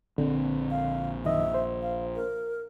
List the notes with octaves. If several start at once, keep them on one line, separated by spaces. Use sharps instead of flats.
A#1 D3 C4
F5
F#2 D#3 D#5 E5
C5
F5
A#4